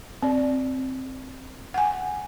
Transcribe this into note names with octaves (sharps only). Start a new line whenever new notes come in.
C4 D5
F#5 G#5